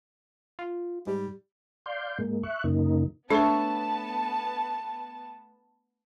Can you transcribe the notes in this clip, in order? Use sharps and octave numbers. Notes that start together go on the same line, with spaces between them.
F4
G#2 G3
D5 F5 C6 G6
G#2 G#3 A#3
E5 C#6 F#6
F#2 C#3 A#3 D#4
A3 B3 D4 A4 B4 C#5 A5